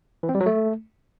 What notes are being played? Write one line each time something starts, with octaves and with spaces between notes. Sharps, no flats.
E3
C4
G3
F#3
A3